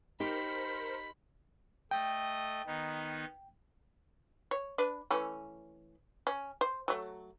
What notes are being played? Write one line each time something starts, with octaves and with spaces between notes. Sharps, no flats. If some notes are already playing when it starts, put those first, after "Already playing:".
D#4 G4 A#4 C5 B5 B6 C#7
A3 D#5 G5
D#3 B3 D#4
C#5
D4 B4
E3 A3 C#4
C#4
C5
F#3 A3